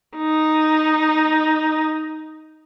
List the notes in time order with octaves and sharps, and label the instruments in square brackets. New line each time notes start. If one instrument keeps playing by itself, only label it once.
[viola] D#4